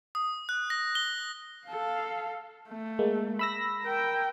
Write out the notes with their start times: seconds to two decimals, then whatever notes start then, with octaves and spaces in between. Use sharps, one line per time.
0.15 D#6
0.49 F#6
0.70 A#6
0.95 G7
1.67 A4 F5
2.68 A3
2.99 G#3 A#3
3.39 B5 E6 A#6
3.83 A#4 G5